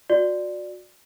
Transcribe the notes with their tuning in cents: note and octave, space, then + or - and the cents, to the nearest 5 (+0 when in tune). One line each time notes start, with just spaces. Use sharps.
F#4 -30 D5 +5